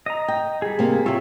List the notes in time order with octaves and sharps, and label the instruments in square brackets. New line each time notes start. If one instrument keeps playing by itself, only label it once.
[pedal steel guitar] D#5 A#5
[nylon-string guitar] G5
[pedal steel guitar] G3 G#4
[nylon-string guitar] C3 A#3
[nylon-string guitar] C3 F4 [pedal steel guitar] C#5 E5